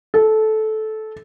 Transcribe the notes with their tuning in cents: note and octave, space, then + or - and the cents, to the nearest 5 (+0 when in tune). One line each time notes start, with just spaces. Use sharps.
A4 -15